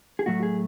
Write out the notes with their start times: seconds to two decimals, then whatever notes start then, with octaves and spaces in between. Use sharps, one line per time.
0.19 G#4
0.26 A2 F#3 A3 F#4
0.43 G#4